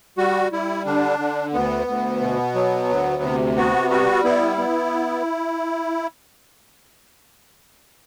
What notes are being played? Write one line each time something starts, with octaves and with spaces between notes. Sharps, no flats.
G3 F#4
G3 E4
D3 D4
D3
D2 B3
D2
B2
F#3
D2
C3
B3 F#4
G3 F#4
B3 E4
B3